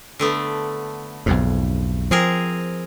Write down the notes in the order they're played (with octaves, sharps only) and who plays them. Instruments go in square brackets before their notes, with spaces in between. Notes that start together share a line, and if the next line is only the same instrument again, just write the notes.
[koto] D3 A3 B3
[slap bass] B1 F2 G#2
[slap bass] F3 [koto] C4 G#4 A#4